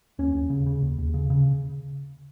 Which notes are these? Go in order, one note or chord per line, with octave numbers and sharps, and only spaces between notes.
D#2 C#4
D#2
C#3
C#3
D#2
D#2
C#3
C#3